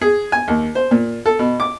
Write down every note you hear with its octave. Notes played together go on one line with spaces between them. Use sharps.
G#4
G#5
D#2
C5
A#2
A4
B2
D6